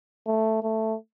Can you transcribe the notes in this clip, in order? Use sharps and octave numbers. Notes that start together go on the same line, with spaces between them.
A3
A3